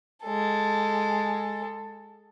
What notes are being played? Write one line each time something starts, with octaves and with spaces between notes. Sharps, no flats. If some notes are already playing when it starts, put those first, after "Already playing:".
G#3 A4